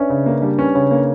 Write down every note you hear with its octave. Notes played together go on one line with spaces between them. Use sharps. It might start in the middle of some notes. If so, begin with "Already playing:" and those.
Already playing: C#4 D4 B4 C#5 D5 E5
C#3
A#3
G3 D4
C#4 B4
C#3 C#5
A#3 C#5